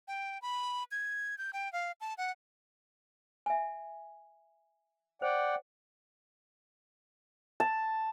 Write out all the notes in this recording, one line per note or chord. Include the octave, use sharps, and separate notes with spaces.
G5
B5
G#6
G6
G5
F5
A5
F#5
E5 G#5
C5 D5 F#5 G5
A5